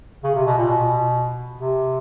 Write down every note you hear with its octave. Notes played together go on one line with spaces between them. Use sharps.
C#3
C3
B2
A#2
B2
C3